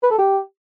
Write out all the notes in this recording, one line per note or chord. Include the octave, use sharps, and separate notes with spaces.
B4
A4
G4